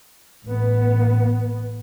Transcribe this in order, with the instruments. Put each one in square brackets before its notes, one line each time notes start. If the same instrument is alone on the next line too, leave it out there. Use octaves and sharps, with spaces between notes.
[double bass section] A1 B3